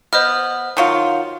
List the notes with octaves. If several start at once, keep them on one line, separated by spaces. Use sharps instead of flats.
B3 C5 D#5 F6
D#3 F#3 F4